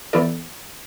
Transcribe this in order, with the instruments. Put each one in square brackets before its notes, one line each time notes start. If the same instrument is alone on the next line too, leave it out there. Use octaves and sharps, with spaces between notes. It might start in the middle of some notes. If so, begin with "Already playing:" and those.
[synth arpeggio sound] E3 B3 E4 A4 D5